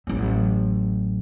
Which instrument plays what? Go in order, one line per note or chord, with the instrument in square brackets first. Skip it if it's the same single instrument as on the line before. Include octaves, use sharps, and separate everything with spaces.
[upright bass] A1 F#3